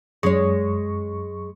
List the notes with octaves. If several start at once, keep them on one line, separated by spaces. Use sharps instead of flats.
F#2 G#3 C#5 C#6